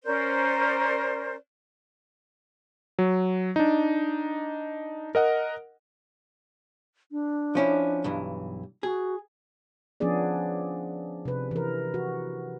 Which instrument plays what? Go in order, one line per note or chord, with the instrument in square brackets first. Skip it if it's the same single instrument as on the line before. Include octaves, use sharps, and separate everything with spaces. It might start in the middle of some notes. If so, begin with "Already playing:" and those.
[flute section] C#4 A#4 C5 D5
[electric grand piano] F#3
D4 D#4
A#4 D#5 F#5
[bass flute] D4
[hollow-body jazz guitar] F3 C#4 E4
B1 G2 E3
[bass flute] F#4 [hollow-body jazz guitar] G#4
[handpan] F3 B3 C#4 D4 G#4 D5
C3 B4
E3 A#4
F#4